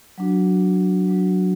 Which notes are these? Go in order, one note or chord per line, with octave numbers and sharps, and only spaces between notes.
F#3 D4 F#4
F#3 D4 F#4